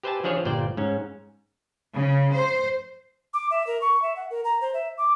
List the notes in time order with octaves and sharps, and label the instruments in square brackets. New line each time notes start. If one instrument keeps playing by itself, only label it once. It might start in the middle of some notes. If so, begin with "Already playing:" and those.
[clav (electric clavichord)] G4 B4 C5 E5 G#5 A5
E3 F3 D4 G#4 C5 C#5
G1 A#2 C5 D5 G5
G#2 C#4
[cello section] C#3
C5
[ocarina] D6
E5
A#4
C#6
E5
F#5
A#4
A#5
C5
E5
D6